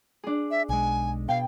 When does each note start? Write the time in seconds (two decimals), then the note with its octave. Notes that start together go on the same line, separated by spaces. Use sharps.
0.24 D4 G#4
0.51 E5
0.69 B1 G#3 G#5
1.29 B2 F5 G5